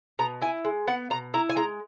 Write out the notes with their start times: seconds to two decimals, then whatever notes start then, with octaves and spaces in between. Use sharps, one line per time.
0.19 B2 A#5
0.42 E4 G#5
0.65 G#3
0.87 B3 F#5
1.10 B2 A#5
1.34 E4 A#5
1.49 G#5
1.56 G#3 A#5